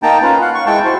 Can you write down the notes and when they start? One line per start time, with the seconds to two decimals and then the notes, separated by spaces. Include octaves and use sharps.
0.03 A#3 D#4 G5 A5 A#5
0.22 C#4 F4 B4
0.41 F5 F#5
0.55 C#6
0.67 G#3 E4 G5 A5 C#6
0.85 E4 F#4 C5